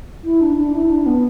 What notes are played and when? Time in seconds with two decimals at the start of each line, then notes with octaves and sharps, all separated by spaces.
0.24 E4
0.41 D4
0.57 D4
0.74 E4
0.90 D4
1.06 B3